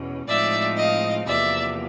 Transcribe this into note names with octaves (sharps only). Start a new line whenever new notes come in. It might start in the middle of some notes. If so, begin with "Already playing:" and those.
Already playing: E2 B2 C#4
A2 F3 G#3 C4 D#4 D5 E5
D#5 F5
E2 C3 F3 A#3 D5 E5